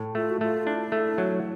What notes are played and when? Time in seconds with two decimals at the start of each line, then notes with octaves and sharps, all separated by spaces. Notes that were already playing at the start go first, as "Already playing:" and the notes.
Already playing: A2
0.15 A3 F4
0.30 F#4
0.41 A3 F4
0.67 D4 E4
0.92 A3
1.18 F#3